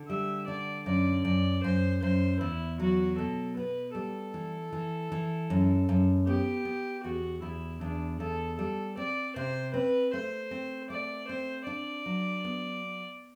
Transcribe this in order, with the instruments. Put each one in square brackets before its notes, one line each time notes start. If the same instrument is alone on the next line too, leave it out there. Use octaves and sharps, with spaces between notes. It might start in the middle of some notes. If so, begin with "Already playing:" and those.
Already playing: [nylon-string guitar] D3
[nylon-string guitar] G3 [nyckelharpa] E5
[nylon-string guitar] D3 [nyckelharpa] D5
[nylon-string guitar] F#2 [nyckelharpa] D5
[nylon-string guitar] F#2 [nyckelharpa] D5
[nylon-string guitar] F#2 [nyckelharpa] C5
[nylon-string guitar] F#2 [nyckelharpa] C5
[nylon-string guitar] E2 [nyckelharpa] E4
[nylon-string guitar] F#3 [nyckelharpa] F#4
[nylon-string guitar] B2 [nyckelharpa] A4
[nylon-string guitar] B3 [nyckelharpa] B4
[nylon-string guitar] G3 [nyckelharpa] A4
[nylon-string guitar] E3
E3
E3
F#2
F#2
[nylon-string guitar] B3 [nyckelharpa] G4
[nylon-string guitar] B3
[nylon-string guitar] E2 [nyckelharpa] F#4
[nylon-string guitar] E2 [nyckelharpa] E4
[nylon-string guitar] E2 [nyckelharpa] D4
[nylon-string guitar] E2 [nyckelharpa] A4
[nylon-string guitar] G3 [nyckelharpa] A4
[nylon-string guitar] C4 [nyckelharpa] D5
[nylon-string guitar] C3 [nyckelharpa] C5
[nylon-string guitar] C4 [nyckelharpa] B4
[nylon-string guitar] A3 [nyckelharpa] C5
[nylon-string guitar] C4
[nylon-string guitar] A3 [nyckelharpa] D5
[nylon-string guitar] C4 [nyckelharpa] C5
[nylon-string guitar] D4 [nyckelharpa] D5
[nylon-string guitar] F#3
B3